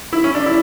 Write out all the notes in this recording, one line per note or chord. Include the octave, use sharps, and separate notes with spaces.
E4
C#4
D4
E4